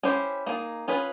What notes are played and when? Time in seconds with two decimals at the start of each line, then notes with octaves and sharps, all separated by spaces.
0.03 C#4 E4 G4 C5
0.46 A#3 D#4 G#4
0.88 C#4 F4 G#4 B4